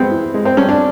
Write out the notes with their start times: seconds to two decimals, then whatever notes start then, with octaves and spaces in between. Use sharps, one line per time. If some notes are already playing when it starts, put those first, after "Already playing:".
Already playing: G2 G#3 B3 C4
0.11 E3
0.34 G#3
0.45 C4
0.57 G2 C#4
0.69 D4